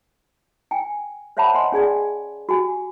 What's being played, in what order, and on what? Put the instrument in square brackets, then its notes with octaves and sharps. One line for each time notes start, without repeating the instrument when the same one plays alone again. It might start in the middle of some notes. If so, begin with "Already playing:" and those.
[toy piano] G5 G#5
C5 C#5 E5 F#5 A5 B5
D#5 F#5 G#5 C6
C#4 G#4 D5 G#5
F#4 G4 G#5